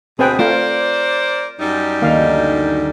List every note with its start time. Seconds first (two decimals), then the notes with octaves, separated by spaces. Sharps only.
0.19 D2 B2 C4 G#4 B4 G5
0.39 A3 F4 A#4 C5 D5
1.59 F#2 G3 D#4
2.02 D2 D#3 A#3 F5